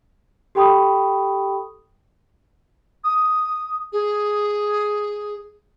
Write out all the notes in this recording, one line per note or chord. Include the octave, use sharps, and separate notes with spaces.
G4 A4 G5 B5 C#6 D#6
D#6
G#4